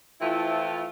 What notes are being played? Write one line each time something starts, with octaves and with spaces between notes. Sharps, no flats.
E3 F3 A3 C4 E4 F4